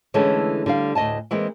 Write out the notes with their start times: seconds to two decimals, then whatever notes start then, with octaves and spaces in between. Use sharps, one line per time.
0.14 D3 E3 G#3 A3 C#4 A4
0.66 D3 G3 D5 F5
0.95 D2 A2 D#5 G#5 A5
1.31 E3 G#3 A#3 C4